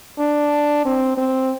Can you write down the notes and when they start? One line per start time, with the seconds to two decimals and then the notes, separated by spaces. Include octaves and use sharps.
0.18 D4
0.85 C4
1.18 C4